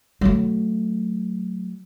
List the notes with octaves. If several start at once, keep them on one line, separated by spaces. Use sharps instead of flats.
F#3 A3